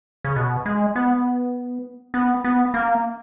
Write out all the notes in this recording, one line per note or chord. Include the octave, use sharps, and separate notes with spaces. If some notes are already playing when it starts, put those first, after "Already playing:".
C#3
B2
G#3
B3
B3
B3
A#3